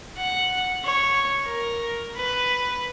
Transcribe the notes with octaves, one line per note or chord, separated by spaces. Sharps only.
F#5
C#5
A#4
B4